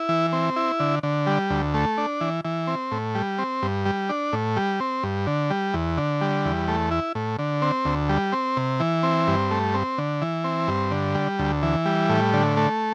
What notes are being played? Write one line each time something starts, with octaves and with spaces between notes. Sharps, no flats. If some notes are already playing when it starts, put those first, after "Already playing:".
Already playing: E4
E3
C4
E4
D3
D3
G3
D2
A3
D4
E3
E3
C4
A2
G3
C4
G2
G3
D4
A2
G3
C4
G2
D3
G3
E2
D3
G3
E2
A3
E4
A2
D3
C4
D2
G3
C4
C3
E3
C4
G2
A3
C4
D3
E3
C4
G2
D3
G3
D2
E3
G3
A2
D3
A3